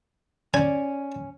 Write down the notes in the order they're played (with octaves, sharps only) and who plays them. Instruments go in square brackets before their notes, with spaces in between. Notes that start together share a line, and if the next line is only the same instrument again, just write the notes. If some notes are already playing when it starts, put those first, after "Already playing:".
[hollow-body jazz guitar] C#4 [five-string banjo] D5 [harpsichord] G#5